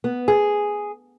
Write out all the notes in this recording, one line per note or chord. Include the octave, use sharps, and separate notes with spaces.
B3
G#4